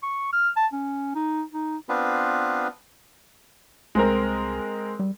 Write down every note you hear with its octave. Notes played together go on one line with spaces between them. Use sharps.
C#6
F6
A5
C#4
D#4
D#4
B3 C4 D4 F4 B4
C2 G#3 C4 A#4
G3